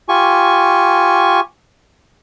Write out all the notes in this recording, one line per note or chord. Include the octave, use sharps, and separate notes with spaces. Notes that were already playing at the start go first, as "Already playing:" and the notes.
F4 G4 G#5 C#6